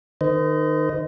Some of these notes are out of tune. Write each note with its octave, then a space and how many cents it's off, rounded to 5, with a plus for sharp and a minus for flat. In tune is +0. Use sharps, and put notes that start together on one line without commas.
D#3 -20 C5 -40 D#5 +5